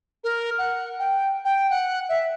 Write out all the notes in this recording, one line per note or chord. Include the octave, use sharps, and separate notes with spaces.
A#4
F#5
G5
G5
F#5
E5